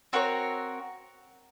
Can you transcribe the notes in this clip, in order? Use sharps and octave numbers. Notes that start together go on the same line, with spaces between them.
C4 F#4 A#4 C#5